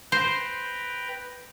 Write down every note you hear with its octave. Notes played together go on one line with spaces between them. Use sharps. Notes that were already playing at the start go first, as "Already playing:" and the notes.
B4 C5 G5 A#5